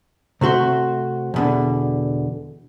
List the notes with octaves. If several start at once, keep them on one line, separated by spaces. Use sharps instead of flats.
C3 A3 F#4 C5
E2 B2 D3